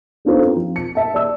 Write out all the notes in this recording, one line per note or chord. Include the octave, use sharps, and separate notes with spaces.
B3 D4 D#4 F4 A4 C5
C4
F3
C#7
E5 A5
D5 E6